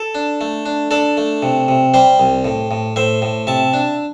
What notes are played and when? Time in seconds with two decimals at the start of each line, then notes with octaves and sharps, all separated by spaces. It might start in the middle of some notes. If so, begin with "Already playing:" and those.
Already playing: A4
0.15 D4
0.41 A3
0.66 D4
0.91 D4 A4 D5
1.17 A3
1.43 C3
1.68 C3
1.94 G3 G4 C5
2.19 C2
2.45 A2
2.71 A2
2.96 A2 C5 E5
3.22 A2
3.47 C3 E5 A5
3.73 D4